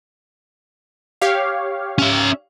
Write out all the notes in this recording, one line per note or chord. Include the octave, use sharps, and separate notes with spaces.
G4 C#5 F5
C#4 E5